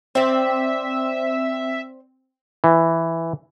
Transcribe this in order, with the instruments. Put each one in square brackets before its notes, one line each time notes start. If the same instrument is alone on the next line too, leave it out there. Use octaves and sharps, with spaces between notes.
[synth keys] C4 [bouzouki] C5 D5 [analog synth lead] E5
[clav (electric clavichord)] E3